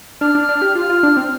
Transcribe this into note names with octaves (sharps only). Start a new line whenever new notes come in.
D4 F6
D4
D4
G4
F4 F6
F4
D4
C4